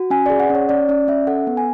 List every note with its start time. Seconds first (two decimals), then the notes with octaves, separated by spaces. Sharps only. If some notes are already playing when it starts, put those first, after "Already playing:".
Already playing: F#4
0.10 C#4 G#5
0.26 G#4 D5
0.40 F#5
0.50 C#4 C#5
0.69 C#4 D5
0.89 C#4 D5
1.08 C#4 E5
1.27 A4 F#5
1.47 B3
1.57 G#5